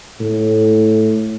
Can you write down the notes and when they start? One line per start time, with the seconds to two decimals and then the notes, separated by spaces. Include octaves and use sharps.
0.20 A2